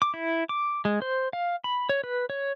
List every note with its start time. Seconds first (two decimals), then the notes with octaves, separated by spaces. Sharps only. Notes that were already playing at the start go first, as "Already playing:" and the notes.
0.02 D6
0.14 E4
0.49 D6
0.85 G#3
1.02 C5
1.33 F5
1.64 B5
1.89 C#5
2.04 B4
2.30 C#5